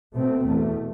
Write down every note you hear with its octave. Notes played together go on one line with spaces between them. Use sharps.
B2 A3 C4
E2 B2 A3